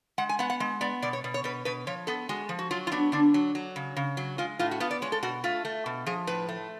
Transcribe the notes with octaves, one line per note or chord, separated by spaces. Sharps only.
G#3 F#5
G#5
B3 F#5
F#5
G#3
B3 D5
B2 D5
C#5
B2
C#5
B2 B4
B2 B4
F3 C#5
B3 A4
G#3 F#4
F3
F#4
F#3 F4
F4
B3 D4
D3 D4
F#3
F#3
C#3
C#3
F#3
G#3 F4
A2 F4
F#4
B3 F4
D5
G#3 C#5
A4
B2 F#4
A3 F4
A3
B2
F3 G#4
A2 B4
A3